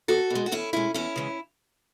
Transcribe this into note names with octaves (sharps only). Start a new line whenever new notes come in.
E2 F#4 A4
B2
G#3
F#4
E2 C#4 E4
B2 G#3 C#4 E4
E2 C#4 E4
C#3 E3 G#3